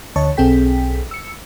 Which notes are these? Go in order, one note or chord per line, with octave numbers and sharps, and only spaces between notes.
D2 D3 C#5 D#5 A5 C#6
B1 C4 G#4 A4 G5 B6
E6 C#7